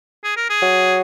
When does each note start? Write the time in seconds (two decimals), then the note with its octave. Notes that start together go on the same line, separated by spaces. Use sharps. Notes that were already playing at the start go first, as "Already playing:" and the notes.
0.24 G#4
0.37 A#4
0.49 G#4
0.62 F#3